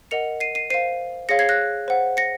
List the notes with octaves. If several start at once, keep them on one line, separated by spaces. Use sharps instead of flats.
A#4 D#5 F#5 C#7 F7
C7 D#7
C7 D#7
C5 F5 C7 D#7
G#4 C#5 F5 A#6 C#7
G#6 C7
F#6 A#6
C5 F#5
A#6 C#7